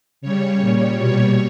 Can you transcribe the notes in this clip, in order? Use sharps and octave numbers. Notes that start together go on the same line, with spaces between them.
C#3 G3 C#5
A#2 G3
B2 G3 C#5